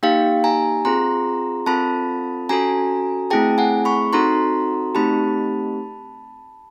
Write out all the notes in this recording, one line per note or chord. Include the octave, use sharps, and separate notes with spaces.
A#3 D#4 G4 F5 G5
G#5 A#5
C4 F4 G#4 A#5 C6
C4 F4 A4 A5 B5
C#4 F#4 A4 G#5 A#5
A3 C4 E4 G#4 G5 A5
F#5 G#5
B5 C#6
C4 D#4 F#4 A4 A#5 C6
A3 C4 D#4 G4 A5 B5